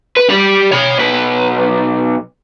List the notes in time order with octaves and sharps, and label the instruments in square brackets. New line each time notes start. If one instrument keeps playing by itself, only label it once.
[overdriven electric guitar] B4
G4 D5
C#5 B5
B1 B4